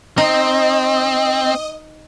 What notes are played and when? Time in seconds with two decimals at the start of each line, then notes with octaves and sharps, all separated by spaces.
0.18 C4 D#4 D#5